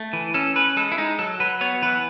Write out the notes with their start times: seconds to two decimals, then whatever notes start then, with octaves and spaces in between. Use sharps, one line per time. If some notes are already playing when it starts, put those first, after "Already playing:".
Already playing: A3
0.13 E3
0.34 C#4 A4
0.56 C#4 B4
0.77 G#3 A4
0.92 E4
0.98 G#3 D#4
1.19 F#3 A4
1.40 F#3 B4
1.61 B3 C#5
1.82 E3 B4